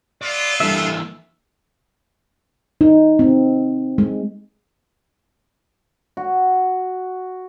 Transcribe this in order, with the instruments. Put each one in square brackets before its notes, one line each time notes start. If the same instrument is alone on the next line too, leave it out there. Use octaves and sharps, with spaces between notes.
[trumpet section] A3 B3 F4 [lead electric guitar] D5
[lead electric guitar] E3 A#3 [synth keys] G3 D4 A4 [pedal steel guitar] E5
[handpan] D#4
C4
G#3
[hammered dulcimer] F#4